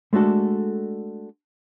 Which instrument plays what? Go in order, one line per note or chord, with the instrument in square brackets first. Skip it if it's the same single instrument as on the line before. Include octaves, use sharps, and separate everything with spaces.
[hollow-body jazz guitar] G#3 A3 D4 F#4 A4